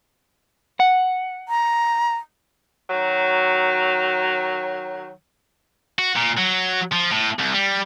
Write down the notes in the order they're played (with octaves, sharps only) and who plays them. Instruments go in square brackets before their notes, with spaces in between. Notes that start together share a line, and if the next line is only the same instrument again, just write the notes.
[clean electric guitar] F#5
[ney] A#5
[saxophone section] D#3 F#3
[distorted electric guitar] F#4
A#2
F#3
F3
A2
C2
G3